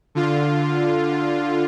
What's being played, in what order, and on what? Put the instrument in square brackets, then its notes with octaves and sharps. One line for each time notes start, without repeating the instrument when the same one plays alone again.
[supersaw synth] D3 F4